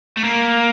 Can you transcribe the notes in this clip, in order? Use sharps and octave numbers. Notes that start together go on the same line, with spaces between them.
A3
A#3